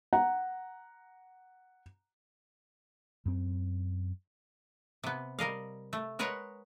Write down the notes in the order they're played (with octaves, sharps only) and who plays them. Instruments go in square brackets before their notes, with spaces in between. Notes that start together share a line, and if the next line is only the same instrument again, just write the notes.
[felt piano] F#5 A#5
[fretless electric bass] F#2 C4
[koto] C3 B3
G3 A#4 D#5 F5
A3
G#3 A#4 B4 C#5 F#5 A#5